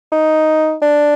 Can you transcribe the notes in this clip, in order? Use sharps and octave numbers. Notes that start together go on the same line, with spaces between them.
D#4
D4